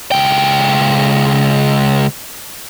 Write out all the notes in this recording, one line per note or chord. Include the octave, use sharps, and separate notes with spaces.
C#2 G5